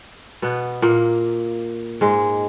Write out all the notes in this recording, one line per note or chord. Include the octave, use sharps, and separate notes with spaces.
B2 B3
A#2 A#3
G#2 G#3